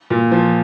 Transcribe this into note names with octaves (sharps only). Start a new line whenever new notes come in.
A#2
F3